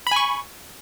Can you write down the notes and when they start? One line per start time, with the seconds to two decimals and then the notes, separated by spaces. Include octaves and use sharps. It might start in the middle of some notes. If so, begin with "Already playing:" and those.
0.07 B5
0.11 G#5
0.16 C#6